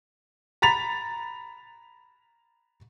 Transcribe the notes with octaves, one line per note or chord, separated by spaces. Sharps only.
A#5 B5 A6 B6 F7